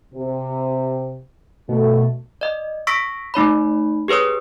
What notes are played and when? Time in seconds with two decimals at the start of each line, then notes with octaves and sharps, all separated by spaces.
0.14 C3
1.69 B2 A3
2.41 D5 D#5
2.87 C#6 E6 A#6 B6 D7
3.34 A3 D#4 C#5 B5
4.08 G4 G#4 B4 C#5 D#6